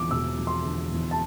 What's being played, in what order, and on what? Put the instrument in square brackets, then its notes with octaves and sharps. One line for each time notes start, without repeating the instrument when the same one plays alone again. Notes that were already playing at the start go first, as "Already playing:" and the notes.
Already playing: [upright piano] E1 E2 D3 F3 D6
E1 E6
F3
C6
D3
E2
A5